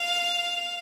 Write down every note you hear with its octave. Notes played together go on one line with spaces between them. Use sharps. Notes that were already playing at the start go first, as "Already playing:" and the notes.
Already playing: F5